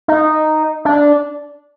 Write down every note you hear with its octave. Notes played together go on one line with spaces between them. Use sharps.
D#4
D4